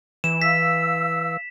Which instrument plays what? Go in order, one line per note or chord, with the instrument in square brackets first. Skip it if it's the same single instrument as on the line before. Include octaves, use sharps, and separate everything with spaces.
[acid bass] E3 [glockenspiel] E7
[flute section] F5 E6 [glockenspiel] B6